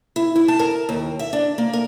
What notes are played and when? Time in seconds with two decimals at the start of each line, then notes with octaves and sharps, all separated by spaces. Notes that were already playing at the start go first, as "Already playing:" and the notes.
0.16 E4
0.36 E4
0.48 A5
0.59 A#4
0.89 D#2
1.19 E5
1.33 D4
1.58 A#3
1.73 A#4